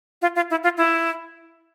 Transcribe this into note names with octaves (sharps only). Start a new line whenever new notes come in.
F4
F4
E4
F4
E4